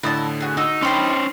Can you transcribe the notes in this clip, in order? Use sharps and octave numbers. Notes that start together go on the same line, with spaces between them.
A2 D3 E4 D#5 A5
F#4 G#4
D#4 F#4 E6
C#4 D4 C5 G5 B5 C6